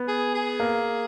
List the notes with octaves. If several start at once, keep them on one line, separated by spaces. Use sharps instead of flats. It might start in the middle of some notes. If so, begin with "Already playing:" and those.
Already playing: B3
G#4
G#4
A#3